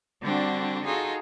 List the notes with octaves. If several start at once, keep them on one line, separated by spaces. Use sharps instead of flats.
D3 G3 C4 D4 F#4
D#4 F4 F#4 G#4 A4